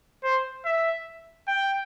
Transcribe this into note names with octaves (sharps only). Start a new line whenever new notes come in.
C5
E5
G5